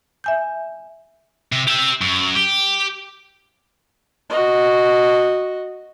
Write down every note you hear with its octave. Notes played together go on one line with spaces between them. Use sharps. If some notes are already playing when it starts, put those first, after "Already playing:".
E5 G#5 G6
C3
G4 E5
F#2
G4
F#4 D#5